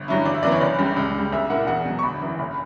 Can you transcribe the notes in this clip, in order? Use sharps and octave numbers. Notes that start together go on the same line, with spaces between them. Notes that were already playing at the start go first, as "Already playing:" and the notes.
Already playing: G1
G2 F#3 C#4 E4
G1 D5
E5
F#2 E3 B3 D5
C#5
F#1 D5
F#2 C#3 G3
C#2
C#3 G3
B1 E5
A#2 A#3 E4 F#5
E2 F#5
B2 F#3
C#6
G1 B5
F#2 E3
F#1